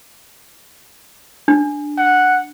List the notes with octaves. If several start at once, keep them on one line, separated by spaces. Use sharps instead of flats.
D4
F#5